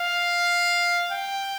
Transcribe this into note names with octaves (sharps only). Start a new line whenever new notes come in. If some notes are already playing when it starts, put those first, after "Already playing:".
Already playing: F5
G5